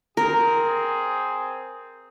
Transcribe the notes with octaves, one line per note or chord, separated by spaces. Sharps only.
C4 G#4 A#4